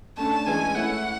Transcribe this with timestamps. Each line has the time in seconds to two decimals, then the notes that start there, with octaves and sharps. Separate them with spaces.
0.17 D3 A3 C#4 A5
0.46 E3 G#3 C#4 G#5
0.75 A3 C#4 E4 F#5